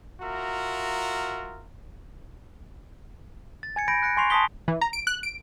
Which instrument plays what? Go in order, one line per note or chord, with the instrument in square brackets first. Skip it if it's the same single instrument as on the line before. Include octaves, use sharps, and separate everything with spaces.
[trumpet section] F4 F#4 A#4 E5 A#5
[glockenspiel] A6
G#5 G#6 C#7
B5 G6 A#6 D7
F#6 A#6 C#7
G#5 C6 C#6 C7 F7
A5 C6 C#6 D#6 B6 G7
[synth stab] E3
A#5
D7
F#6
D7